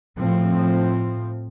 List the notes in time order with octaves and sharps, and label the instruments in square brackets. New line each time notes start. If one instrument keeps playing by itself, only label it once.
[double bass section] A2 F3 C4